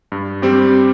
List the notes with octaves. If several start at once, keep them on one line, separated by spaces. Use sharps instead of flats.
G2
G3 C4 G4